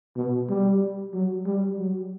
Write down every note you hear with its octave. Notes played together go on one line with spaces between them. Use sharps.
B2
G3
F#3
G3
F#3